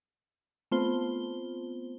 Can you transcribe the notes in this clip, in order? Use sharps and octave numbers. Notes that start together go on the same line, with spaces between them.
A3 B3 C4 F4 C5 G7